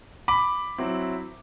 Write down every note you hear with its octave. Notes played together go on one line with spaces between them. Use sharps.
B5 D6
F#3 C4 E4